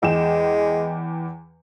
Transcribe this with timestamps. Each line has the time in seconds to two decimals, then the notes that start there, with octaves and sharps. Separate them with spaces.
0.03 E2 G#3 G5 E7